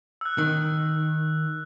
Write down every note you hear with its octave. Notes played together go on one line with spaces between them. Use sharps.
E6 F#6
D#3